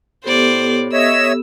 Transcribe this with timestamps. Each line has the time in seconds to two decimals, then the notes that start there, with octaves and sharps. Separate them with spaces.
0.24 A2 B3 G4 A4 C5 D5
0.93 C#5 D#5 E5 E6 E7